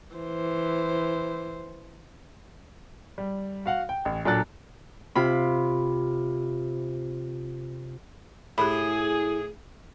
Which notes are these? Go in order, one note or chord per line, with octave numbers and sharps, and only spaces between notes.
E3 C5
G3
F#4 F5 F#5
G5
A1
A#2 F#3 D4 A4 F#6 A6
C3 F4 B5
A2 E4 G4 G#4 B5